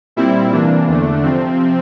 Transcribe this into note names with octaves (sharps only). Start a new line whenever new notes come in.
A#2 G3 C4 E4
C3 E3 A#3 D4
E2 D3 A3
C3 F3 C4